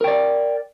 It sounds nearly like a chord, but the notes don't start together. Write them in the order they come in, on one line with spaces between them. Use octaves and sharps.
A#4 G5 D5